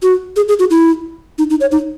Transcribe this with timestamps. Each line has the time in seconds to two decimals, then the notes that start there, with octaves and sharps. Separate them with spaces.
0.02 F#4
0.36 G#4
0.48 G#4
0.59 F#4
0.70 E4
1.38 D#4
1.50 D#4
1.60 C#5
1.71 D#4